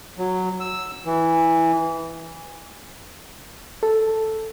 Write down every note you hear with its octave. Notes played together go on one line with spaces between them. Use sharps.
F#3
E6
E3
A4